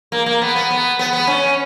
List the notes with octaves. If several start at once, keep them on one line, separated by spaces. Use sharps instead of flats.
A#3
A#3
B3
B3
B3
B3
B3
C#4